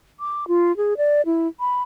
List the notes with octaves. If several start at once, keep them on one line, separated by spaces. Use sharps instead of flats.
D6
F4
G#4
D5
E4
B5